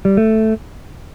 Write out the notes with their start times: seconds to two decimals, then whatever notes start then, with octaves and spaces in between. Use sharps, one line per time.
0.05 G3
0.17 A3